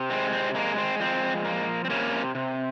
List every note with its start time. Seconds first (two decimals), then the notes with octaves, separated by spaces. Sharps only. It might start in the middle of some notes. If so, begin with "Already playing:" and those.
Already playing: C3
0.10 G#3 C4
0.32 C4
0.55 G#3 A#3
0.78 C4
1.00 F3 C4
1.45 A#3
1.85 C4
1.90 C3 A#3 C#4
2.35 C3